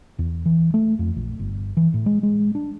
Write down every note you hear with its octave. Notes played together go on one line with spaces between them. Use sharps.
E2
E3
A3
F2
A#1
G1
E3
A2
G#3
G#3
D4